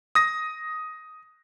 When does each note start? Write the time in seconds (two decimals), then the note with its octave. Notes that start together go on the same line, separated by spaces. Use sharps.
0.15 D#6 A#6